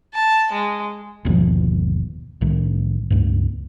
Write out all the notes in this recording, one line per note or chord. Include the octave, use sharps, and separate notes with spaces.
A5
G#3
G1 D#2 B2 F3
C2 A2 D#3
C#2 G2